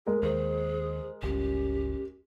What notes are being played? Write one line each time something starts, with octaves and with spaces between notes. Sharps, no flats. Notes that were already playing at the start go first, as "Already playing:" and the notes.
G#3 G#4 A#4
D#2 G#4 C5
G1 C#2 C#4 G4